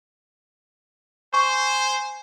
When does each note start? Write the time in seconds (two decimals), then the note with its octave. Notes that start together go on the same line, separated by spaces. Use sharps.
1.34 C5 G#5 C#6